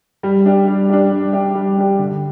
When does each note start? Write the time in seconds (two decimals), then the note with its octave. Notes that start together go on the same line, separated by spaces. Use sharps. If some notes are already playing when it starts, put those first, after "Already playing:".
0.23 G3
0.45 D4 G4
0.67 G3
0.90 D4 G4
1.11 G3
1.33 D4 G4
1.55 G3
1.77 D4 G4
1.99 D3